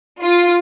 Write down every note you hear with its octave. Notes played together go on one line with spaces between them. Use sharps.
F4